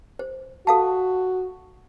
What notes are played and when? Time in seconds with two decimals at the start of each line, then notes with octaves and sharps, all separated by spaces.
0.19 C5
0.67 F#4 A4 F5 A5